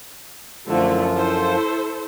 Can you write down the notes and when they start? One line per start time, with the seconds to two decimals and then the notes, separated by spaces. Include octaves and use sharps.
0.68 F#2 D3 F3 A3 E4 F4
1.17 E4 A4 C5